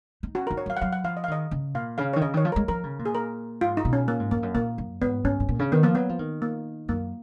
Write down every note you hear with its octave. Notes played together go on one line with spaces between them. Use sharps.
D#4
C#4 F#4
A#4
D#4
C#5
F#3 F5
F#5
F#3 F5
F#5
F3 F5
D#5
F5
D#3 D#5
C#3
A#2 F5
C#3 F5
D#3 C#5
C#3 D#5
D#3 C#5
F3
A#4
G#3
F3 A#4
C#3
A#2
G#4
A#4
G#2 F4
D#4
B2
C#4
A#2 A#3
G#2
F2 A#3
F#2
A#2 A#3
F#2
G#2 B3
G#2 C#4
G#2
A#2
C#3
D#3 B3
F3 A#3
F#3 B3
F3
D#3
A#3
F#2 A#3